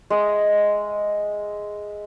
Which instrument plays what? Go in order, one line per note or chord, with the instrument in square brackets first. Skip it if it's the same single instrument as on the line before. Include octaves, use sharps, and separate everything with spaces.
[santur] G#3 D#5 E5